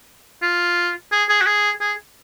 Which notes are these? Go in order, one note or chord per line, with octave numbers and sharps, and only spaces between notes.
F4
G#4
G#4
F#4
G#4
G#4